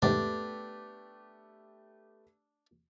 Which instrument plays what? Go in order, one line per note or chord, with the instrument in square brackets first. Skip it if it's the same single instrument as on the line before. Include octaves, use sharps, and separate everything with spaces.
[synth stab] E2 G#2 C3 [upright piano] A3 B3 G4 [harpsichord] D4